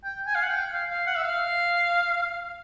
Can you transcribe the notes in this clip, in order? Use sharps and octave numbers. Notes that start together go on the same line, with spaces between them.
G5
G#5
F5
F#5
G5
F5
F5
F#5
E5
F5